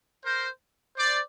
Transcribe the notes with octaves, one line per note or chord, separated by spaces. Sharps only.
A#4 C5
C5 D5